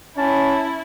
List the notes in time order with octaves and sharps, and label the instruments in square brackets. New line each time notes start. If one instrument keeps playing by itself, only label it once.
[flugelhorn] C#4 [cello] E4 [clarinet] A5